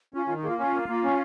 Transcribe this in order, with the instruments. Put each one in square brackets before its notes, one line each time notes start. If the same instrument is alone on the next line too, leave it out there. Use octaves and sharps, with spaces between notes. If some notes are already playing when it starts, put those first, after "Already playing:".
[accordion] C#4 [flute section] F4
[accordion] D#3 [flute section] F4
[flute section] D#4
[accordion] A#3 [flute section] F4 G#4
[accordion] C#4 [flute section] F4
[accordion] A#3
A#3
C#4